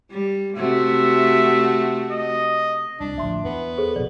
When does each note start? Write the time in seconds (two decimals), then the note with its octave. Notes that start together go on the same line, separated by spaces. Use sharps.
0.11 G3
0.56 C3 A3 F#4 E5
2.11 D#5
3.00 C2 D4
3.18 A1 D2 F3 E5 C6
3.45 E2 B3
3.78 G#4 A4 C5
3.96 A#1 B2 D5